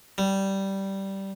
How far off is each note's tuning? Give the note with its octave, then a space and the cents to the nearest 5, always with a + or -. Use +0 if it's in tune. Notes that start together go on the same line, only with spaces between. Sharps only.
G3 -10